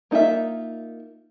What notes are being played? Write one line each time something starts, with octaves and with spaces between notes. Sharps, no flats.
A#3 D#4 F4 G#4 E5